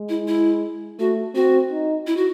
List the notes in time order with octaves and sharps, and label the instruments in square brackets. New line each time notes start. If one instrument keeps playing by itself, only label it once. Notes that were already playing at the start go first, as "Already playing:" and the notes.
Already playing: [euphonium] G#3
[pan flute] E4
E4
[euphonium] A3 [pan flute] F#4
[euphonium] C4 [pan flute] F#4
[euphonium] D#4
[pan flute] E4
F#4